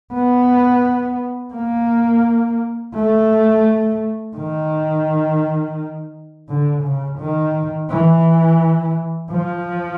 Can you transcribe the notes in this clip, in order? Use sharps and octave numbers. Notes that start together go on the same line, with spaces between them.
B3
A#3
A3
D#3
D3
C#3
D#3
E3
F3